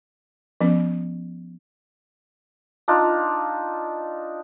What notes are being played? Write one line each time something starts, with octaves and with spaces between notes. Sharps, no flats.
F3 B3 C#4
D4 D#4 F4